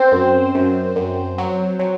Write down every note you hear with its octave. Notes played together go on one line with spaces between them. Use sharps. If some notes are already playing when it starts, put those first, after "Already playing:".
Already playing: C4 C5
F#2
F#2
F#2
F#3
F#3